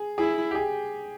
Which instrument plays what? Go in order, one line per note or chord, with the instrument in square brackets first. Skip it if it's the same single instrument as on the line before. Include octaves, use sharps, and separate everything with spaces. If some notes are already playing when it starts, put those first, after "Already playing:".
Already playing: [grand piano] G#4
[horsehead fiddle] E4 [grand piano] G#4
[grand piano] G4
G#4